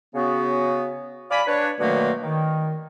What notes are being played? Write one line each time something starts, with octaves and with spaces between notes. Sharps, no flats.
C#3 B3 F#4
D5 F5 G#5 B5
D4 B4 C#5
B2 D3 D#3 F#3 A3 A#3
D#3